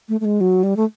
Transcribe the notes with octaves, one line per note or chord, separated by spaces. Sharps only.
A3
A3
G#3
F#3
G3
A3